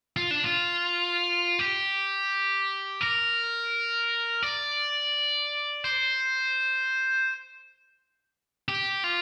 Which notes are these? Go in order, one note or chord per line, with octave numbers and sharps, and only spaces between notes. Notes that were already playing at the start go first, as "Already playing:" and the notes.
F4
D4
F4
G4
A#4
D5
C5
G4
F4